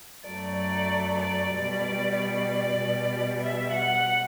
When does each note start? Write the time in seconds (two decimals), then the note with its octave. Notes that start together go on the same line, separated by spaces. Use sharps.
0.25 F#2 F#3 A3 D5
0.57 D5
1.20 D5
1.52 B2 G3
1.84 D5
2.16 D5
2.79 B2 G3
3.41 E5
3.74 F#5